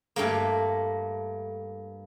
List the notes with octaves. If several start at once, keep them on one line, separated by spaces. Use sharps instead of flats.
G2 A3 A#3